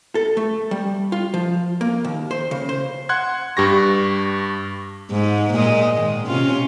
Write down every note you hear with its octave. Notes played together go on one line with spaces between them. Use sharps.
A4
A3
G3
F4
F3
A#3
D#2
C5
C#3
C5
F#5 C6 F#6 G#6
G2 G4 C#6 A#6
G#2
A#2 G#3 D#5
G#2 D#3
C3 C#4 F4